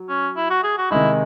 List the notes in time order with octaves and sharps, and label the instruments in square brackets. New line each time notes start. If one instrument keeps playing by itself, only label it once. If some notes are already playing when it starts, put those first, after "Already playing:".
Already playing: [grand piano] F#3
[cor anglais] C#4
E4
F#4
G#4
F#4
[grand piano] C3 D#3 G#3 D#4 [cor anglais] E4